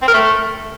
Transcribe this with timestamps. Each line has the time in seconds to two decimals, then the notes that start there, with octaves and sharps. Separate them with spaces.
0.02 C4
0.08 A#4
0.14 A3